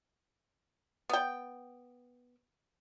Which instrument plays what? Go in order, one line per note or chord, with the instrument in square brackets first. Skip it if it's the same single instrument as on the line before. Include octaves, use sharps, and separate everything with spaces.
[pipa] B3 G5